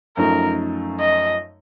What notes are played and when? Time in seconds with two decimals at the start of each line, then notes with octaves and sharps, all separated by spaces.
0.17 F#2 F3 A3 D#4 A#4
1.00 D#5